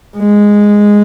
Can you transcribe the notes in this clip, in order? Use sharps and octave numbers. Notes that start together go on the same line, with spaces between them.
G#3